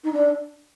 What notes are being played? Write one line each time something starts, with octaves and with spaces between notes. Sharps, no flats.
D#4
D4